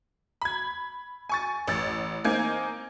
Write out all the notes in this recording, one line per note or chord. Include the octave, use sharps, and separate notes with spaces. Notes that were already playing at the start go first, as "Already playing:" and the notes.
B5 G#6
G#5 C#6 A6
A1 E6 A6
A#3 C4 D#4 G#5 G6 G#6